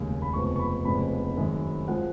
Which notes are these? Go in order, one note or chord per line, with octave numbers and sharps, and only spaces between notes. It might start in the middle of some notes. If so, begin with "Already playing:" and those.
Already playing: F1 D#2 C#3 G#3
B5
F1 F2 C#3 G#3 B3 C#6
C#6
B5
F1 F2 C#3 G#3 B3 B5
F#2 D#3 G#3
F3 G#3 F#5